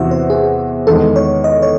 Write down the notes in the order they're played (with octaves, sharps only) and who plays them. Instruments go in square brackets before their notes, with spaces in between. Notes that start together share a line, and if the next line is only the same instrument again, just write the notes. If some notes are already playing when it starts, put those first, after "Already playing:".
Already playing: [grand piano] E2 C3 E3 C4 F#4 [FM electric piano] E5 F#5
[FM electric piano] C5
G#4
[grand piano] E2 D#3 G#3 [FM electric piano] A4
[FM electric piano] C#5
D#5
C#5